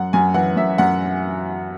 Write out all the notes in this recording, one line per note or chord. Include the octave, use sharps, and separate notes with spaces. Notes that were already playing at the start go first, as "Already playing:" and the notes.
Already playing: F#2 F#5
F#2 G#5
E3 F#5
F#2 E5
F#2 F#5